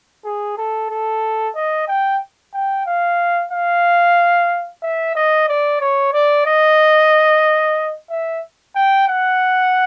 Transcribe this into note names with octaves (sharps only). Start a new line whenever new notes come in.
G#4
A4
A4
D#5
G5
G5
F5
F5
E5
D#5
D5
C#5
D5
D#5
E5
G5
F#5